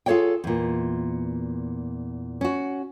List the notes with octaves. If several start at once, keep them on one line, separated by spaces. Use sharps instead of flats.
F4 G#4 A4 C#5 D5 G5
E2 A#2
C#4 F#4